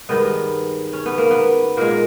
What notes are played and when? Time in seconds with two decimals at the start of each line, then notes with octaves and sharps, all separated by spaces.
0.09 G2 D#3 G#3 B3
0.93 C#4
1.06 B3
1.18 A#3
1.31 B3
1.77 A#2 G#3 A#3